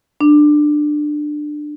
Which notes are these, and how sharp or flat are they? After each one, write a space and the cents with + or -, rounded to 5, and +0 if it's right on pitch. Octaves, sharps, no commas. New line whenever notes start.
D4 +20